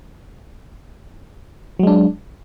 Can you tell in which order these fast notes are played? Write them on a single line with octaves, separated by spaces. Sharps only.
F#3 G#3 D4